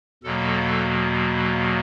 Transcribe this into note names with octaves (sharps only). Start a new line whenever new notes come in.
E2 B2 F#3 A#3 A4